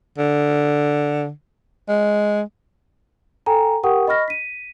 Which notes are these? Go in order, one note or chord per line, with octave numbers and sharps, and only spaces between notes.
D3
G#3
A4 G5 G#5 A#5
G4 A#4 F#5 G5 C#6 D#6
D#5 B5 C#6 F6 A#6
B6 D#7